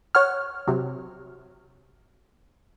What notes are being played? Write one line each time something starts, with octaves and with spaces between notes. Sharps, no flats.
C#5 F#5 F6
C3 F#3